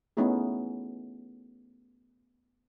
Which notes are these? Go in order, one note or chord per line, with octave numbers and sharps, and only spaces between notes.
A3 B3 C#4 D#4 E4 G#4